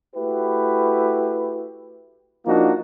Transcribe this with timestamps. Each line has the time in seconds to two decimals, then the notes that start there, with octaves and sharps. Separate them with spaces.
0.16 A3 E4 F#4 G4 B4
2.46 F3 A#3 D4 D#4 F4 F#4